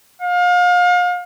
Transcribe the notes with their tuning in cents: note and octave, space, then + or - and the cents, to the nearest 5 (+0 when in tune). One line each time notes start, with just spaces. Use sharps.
F5 +35